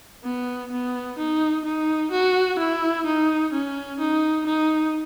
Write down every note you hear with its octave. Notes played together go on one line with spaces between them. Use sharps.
B3
B3
D#4
D#4
F#4
E4
D#4
C#4
D#4
D#4